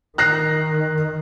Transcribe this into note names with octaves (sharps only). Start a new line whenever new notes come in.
D#3 F#6 A#6 C7